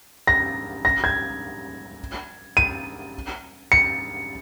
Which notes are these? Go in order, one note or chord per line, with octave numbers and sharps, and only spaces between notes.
A#6
A#6
G#6
D#7
C#7